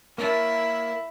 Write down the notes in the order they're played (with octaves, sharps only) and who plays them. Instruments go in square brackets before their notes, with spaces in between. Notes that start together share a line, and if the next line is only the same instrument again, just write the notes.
[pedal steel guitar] A#3 C#5 A5 [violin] E4 [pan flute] A#4